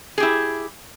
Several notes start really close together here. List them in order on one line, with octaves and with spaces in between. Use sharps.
G#4 G4 E4